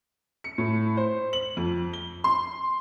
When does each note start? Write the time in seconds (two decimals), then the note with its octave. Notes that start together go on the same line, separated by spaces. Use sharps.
0.44 C#7
0.58 A2
0.97 C5
1.33 F#7
1.57 F2
1.93 G7
2.24 C6